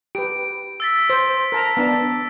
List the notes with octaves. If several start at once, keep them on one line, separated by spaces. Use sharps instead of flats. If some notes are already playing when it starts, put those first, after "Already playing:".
G4 B4 D7
E6 A6 B6
C5
A#4 A5 A#5
B3 D4 A5